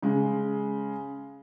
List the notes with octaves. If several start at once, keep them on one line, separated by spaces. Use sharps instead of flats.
C#3 G#3